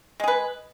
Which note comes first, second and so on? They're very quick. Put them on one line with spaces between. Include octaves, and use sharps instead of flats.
G#3 G#4 B4